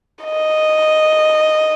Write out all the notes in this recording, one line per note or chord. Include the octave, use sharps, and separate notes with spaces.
D#5